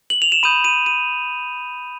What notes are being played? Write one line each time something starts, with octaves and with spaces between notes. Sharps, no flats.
F#7
F7
E7
B5 D#6 G6 D#7
D#7
D#7